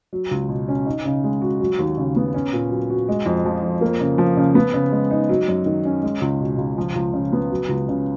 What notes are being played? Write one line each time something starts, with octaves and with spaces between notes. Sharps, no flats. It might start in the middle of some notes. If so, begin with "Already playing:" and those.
F#3
C#2
B2
C#4
D#4
C#3
G#3
F#4
F#3
D#2
C#3
B3
C#4
A#2
F#3
F#4
G#3
F2
F3
F2
A#3
C#3
F3
C#3
B3
C#3
G#3
D#4
F#3
F#2
D#3
C#4
G#3
C#2
B2
C#2
F3
C#2
C#3
B3
F#3
C#2
C#3